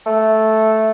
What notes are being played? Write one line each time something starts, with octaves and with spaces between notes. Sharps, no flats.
A3